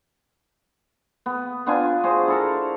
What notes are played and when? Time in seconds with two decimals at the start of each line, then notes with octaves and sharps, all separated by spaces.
1.26 B3
1.66 B3 D4 F4 G#5
2.03 F#4 G#4 C5
2.28 E4 A4 A#4